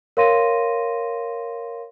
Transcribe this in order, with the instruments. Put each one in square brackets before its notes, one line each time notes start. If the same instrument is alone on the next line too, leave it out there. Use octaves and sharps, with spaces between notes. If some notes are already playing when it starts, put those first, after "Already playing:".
[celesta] A#4 C#5 F5 C6 A#6 D#7